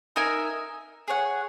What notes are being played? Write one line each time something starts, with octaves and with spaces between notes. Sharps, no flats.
D#4 A#4 E5 G#5
G#4 C#5 F#5